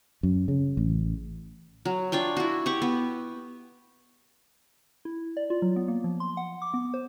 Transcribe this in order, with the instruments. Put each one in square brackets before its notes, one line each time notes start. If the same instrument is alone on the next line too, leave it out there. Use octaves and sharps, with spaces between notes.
[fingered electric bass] F#2
C#3
A1
[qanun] F#3
D4 F4 C#5 G5
E4 F#4
G4 F#5 C#6
B3
[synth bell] E4
D5
F4
F#3
B3
A#3
F3
C6
F#5
D6
B3
C5